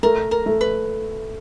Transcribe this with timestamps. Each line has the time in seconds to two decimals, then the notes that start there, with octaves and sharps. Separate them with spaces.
0.03 A3 A#4
0.31 A#4
0.46 A3
0.61 B4